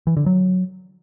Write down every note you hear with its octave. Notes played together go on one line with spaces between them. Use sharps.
E3
D3
F#3